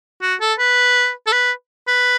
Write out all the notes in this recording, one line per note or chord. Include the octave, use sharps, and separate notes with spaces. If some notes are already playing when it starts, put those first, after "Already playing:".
F#4
A4
B4
A4
B4
B4